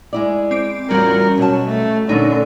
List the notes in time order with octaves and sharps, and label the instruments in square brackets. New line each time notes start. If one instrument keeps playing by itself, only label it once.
[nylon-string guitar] G#3 E4 D5
[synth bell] C4 D6 D7
[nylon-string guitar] E2 A2 F4 [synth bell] G3 C#4 F#4 [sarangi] A#4
[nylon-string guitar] B2 A5 [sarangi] F#3
[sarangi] A3
[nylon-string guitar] A#2 C#4 [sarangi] D3 [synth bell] A3 D#4